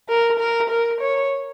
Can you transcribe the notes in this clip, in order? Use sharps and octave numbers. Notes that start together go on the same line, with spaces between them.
A#4
A#4
A#4
C#5